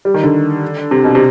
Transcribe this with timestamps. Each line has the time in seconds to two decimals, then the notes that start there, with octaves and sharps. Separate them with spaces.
0.05 G3
0.14 D#3
0.23 D3
0.91 C3
1.04 B2
1.15 C3